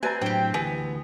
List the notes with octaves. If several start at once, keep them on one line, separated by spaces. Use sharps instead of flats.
C4 B4 D5 E5 G#5 A#5
A2 F#3 D4 G4 C5 G5
D2 E3 B3 G4 G#5